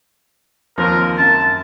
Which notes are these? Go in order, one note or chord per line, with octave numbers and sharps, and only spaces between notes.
D#2 F3 C4 A#4
F#2 A5